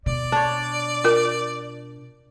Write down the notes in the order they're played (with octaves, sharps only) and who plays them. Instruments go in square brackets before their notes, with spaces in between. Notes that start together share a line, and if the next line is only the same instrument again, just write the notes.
[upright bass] B2 [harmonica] D5
[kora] D4 C#5
[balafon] F4 A#4